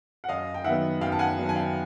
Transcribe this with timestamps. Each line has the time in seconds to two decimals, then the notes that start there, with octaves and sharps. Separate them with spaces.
0.24 F#5
0.29 F#2 D#5 F5
0.54 G5
0.64 D#3 F#3 B3 E5 F#5
1.01 F#2 F5 G5
1.12 A5
1.19 F#5 G#5
1.37 D#3 F#3 B3
1.49 G#5
1.55 F5 G5